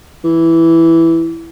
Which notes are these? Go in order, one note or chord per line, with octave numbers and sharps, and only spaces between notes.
E3